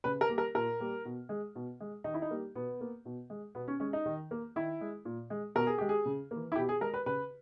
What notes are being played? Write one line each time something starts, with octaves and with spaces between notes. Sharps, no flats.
C#3 B4
A#4
G3 A#3
A#4
A#2 A#4
G3 A#3
B2
G#3
B2
G#3
D#3 D#4
E4
D#4
G3 A#3
B2 B3
A#3
B2
G#3
B2 B3
C#4
G#3 C#4
D#4
D#3
A#3
D#3 E4
G#3
A#2
G#3
B2 A#4
G#4
G#3 G4
G#4
C#3
E3 A#3
E4
B2 G4
G#4
G#3 A#4
B4
C#3 B4